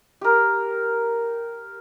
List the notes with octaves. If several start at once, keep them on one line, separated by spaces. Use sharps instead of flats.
G4 A#4